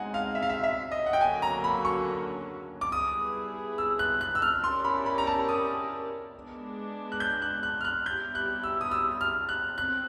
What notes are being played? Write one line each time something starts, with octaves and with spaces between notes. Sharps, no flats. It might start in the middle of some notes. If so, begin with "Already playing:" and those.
Already playing: G#3 C4 D#4 F#5 G#5
F5
E5
F5
E5
E5
D#5
F#5
G5
D3 F#3 A#3 C#4 F#4 G#5
A#5
B5
C#6
D6
G3 B3 E4 G#4 B4 D#6
E6
F#6
F#6
E6
F6
C#4 E4 G4 A#4 D5 C6
B5
B5
A#5
A5
D#6
G#3 B3 D4
F#6
G6
F#6
F#6
F6
F#6
G3 B3 E4 G4 G6
F#6
E6
D#6
E6
F6
F#6
C4 F#6